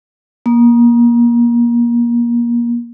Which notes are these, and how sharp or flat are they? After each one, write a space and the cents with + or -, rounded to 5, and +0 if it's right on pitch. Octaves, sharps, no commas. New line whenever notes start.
A#3 +25